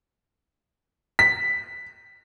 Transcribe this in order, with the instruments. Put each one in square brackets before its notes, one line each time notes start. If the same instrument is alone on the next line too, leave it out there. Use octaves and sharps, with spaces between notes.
[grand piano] B6